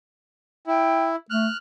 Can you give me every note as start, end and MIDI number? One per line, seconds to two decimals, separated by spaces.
0.67 1.16 64
0.67 1.08 79
1.30 1.48 57
1.30 1.57 89
1.30 1.57 90